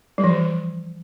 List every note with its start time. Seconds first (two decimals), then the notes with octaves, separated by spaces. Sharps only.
0.18 G3
0.24 F3
0.29 E3